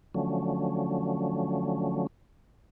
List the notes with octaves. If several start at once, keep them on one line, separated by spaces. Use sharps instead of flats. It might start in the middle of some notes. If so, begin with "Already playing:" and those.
D3 F3 F#3 A3 C#4